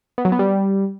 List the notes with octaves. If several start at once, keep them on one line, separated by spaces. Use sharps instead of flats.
B3
F#3
B3
G3